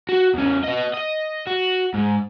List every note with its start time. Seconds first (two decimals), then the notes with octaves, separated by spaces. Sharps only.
0.09 F#4
0.34 E2 C#4
0.64 B3 D#5
0.94 D#5
1.47 F#4
1.94 G#2